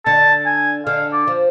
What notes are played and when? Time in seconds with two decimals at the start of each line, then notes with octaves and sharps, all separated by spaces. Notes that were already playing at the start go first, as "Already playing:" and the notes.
0.06 D3 A5
0.46 G#5
0.86 D3 F5
1.13 D5
1.27 F3